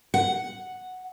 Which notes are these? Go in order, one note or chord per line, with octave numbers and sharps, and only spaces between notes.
F#5